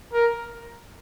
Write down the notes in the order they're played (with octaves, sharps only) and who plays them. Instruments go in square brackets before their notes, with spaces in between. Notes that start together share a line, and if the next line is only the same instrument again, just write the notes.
[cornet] A#4